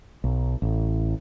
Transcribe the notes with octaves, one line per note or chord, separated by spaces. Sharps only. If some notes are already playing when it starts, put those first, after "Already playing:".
B1
A1